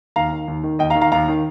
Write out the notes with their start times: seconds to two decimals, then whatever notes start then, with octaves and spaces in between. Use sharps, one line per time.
0.16 D#2 F5 A#5
0.32 D#3
0.48 D#2
0.64 D#3
0.79 D#2 D#5 G5
0.90 F5 A#5
0.95 D#3
1.01 F5 A#5
1.12 D#2 F5 A#5
1.28 D#3